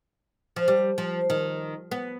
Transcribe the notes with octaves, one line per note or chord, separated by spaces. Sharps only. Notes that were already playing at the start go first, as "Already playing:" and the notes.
F3
G3
F3
D#3
B3